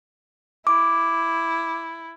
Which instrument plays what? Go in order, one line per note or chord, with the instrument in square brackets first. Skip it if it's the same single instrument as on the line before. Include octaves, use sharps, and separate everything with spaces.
[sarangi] E4 [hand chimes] D6